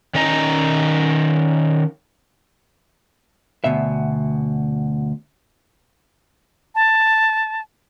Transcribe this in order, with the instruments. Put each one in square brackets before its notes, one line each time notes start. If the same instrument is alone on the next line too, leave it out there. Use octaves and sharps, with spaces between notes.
[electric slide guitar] D#3 C#4 D#5 A#5
[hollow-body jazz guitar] D2 B2 E5
[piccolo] A5